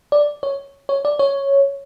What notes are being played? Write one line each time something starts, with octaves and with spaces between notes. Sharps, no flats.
D5
C#5
C#5
D5
C#5